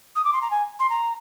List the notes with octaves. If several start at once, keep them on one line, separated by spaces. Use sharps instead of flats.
D#6
D6
C6
A#5
G#5
C6
A#5